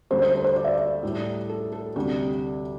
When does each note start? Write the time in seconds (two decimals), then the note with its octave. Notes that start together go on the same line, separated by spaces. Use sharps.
0.10 D2 D3 G3 C5
0.22 C5
0.34 A4
0.45 C5
0.56 D5
0.64 E5
0.73 D5
1.03 A2 G3
1.50 A4
1.72 A4
1.96 D2 C3 G3 G4